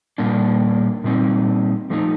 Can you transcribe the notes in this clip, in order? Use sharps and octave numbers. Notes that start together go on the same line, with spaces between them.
A#2 G3 A#3 D4
A#2 G3 C4 D#4
F3 A3 D#4